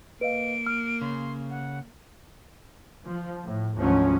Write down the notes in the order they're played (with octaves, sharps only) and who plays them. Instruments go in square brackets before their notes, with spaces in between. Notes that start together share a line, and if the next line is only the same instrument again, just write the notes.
[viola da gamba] A#3 [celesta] B4 D#5 F5 [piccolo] D7
[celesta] F6
[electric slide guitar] C#3 [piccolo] C6
[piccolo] F#5
[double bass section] F3
A2
D2 G#2 F3 F#3 C#4